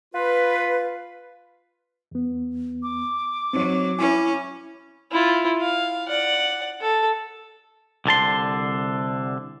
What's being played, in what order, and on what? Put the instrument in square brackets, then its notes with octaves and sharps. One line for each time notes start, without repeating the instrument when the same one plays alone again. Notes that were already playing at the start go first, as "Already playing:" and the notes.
[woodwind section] F4 B4
[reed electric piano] E2 B3
[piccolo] D6
[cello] F#3 [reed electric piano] C4 D#4 C#5
[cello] C#4 [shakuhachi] E4 [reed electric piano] G#5
[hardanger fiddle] E4 F4
F5
D5 F#5
A4
[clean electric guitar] C2 D3 A5 C6